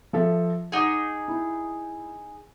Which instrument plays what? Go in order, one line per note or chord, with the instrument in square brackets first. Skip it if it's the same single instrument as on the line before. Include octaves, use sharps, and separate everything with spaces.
[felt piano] F3 A4 E5
[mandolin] D#4 G#4 [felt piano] F#5 D6
[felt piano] E4